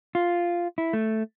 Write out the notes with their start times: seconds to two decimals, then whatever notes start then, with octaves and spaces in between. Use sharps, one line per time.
0.15 F4
0.78 E4
0.93 A3